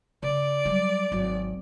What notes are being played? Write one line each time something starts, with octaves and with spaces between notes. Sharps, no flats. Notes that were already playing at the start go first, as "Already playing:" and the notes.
C#3 D5
F#3 G3
G#1 F#3